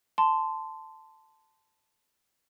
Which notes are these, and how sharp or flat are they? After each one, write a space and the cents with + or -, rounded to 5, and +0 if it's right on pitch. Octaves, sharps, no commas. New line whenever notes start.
A5 +0 C6 -15